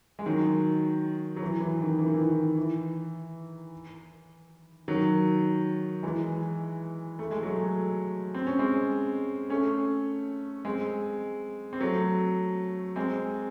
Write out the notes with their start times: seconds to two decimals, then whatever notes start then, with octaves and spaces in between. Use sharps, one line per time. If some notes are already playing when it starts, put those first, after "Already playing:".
0.19 G#3
0.26 D#3 F#3
1.36 F#3
1.42 E3
1.60 E3
1.81 D#3
1.99 E3
2.07 D#3
2.14 E3
2.29 D#3
2.57 E3
4.88 D#3 F#3
6.03 E3 G#3
7.19 A3
7.31 G#3
7.42 F#3 A3
8.34 C4
8.47 C#4
8.59 G#3 C4
9.50 A3 C#4
10.65 G#3 C4
11.73 C4
11.81 F#3 A3
12.96 G#3 C4